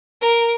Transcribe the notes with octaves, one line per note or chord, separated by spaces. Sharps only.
A#4